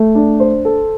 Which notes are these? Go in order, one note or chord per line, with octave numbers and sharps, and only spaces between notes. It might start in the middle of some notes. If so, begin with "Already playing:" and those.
Already playing: A3
D4
C5
A4